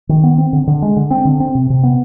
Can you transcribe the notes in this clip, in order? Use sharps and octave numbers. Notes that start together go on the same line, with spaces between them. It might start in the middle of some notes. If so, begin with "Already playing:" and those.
D#3
B3
C4
D3
D3
G#3
D3
C4
D3
C4
C3
C3
B3